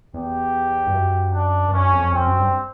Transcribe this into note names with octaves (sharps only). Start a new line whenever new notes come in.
E2 G4
G2
F#2
D4
G2
F#2 C#4
F2
F2 C4
F#2
G2